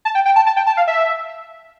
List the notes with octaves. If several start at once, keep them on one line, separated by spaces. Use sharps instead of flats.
A5
G5
G5
A5
A5
G5
A5
F5
E5